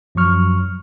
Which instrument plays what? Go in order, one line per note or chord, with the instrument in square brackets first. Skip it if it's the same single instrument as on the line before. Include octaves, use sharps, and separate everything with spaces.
[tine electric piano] F#2 F3 F#3 C#6 F6